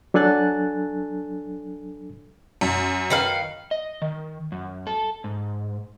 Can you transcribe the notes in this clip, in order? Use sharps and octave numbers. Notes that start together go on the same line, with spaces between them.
F#3 D4 A4 G#5 F#6 A6
F#2
D#3 B4 F5
D#5
D#3
F#2
A4
G#2